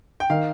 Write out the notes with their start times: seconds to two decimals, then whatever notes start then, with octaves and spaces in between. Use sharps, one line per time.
0.20 G5
0.30 D#3 F5